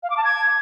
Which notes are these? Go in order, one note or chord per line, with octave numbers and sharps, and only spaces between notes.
F5
D6
A5
G#6